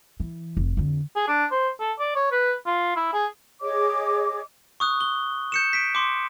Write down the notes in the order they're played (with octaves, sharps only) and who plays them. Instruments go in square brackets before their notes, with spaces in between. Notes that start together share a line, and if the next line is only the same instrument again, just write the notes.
[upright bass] E3
F1
F2 D3
[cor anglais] G#4
D4
C5
A4
D5
C#5
B4
F4
E4
G#4
[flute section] G#4 C#5 D#5 D6
[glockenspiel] C#6 D#6 F#6
G7
G6 C#7 E7
B6 D7
C6 D6